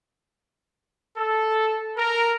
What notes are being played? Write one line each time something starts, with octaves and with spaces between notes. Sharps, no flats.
A4
A#4